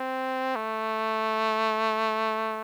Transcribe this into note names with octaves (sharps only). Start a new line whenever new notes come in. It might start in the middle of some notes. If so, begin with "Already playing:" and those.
Already playing: C4
A3